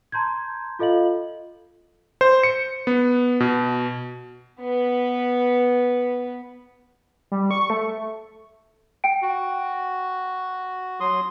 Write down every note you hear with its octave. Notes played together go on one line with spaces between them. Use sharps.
A5 A#5 C6 G6 G#6
F4 A4 D#5 F5 F#7
C5
C#7
B3
B2
B3 B4
G3
C#6
A3
G5 D7
F#4
F#3 C6 D#6